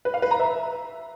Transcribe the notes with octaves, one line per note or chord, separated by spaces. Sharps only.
B4
F5
B4
A#5
E5